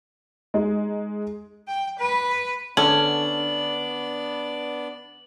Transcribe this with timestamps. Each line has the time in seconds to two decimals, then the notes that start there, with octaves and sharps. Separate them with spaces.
0.54 G#3 D#4
1.68 G5
1.99 B4
2.77 D3 B3 C#4 D4 D5 F#7